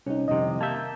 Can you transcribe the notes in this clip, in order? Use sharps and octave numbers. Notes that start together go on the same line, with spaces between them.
C2 C#4 D#4
C2 F2 C3 D#3 D#5
A#3 E5 A5 G6